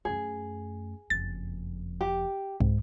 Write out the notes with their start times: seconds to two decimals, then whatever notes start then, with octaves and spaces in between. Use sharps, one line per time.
0.05 F#2 A3 G#4
1.10 F#1 F2 A6
2.01 G4
2.60 C2 G#2